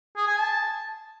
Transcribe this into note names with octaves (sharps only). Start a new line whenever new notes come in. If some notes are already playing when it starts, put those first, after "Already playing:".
G#4
G#5
A5